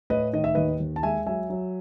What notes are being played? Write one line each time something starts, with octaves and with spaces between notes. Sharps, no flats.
A2 B4 D#5
D#3 D#5
E5
D#2 B4 D#5
D#2
A5
G#3 E5 G#5
F#3 E5 G#5
F#3